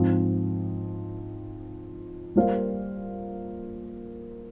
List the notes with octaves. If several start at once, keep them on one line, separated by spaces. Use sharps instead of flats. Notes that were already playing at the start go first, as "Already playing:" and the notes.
Already playing: G#2 F3 C4 F4
G3 A#3 F4 C5 F5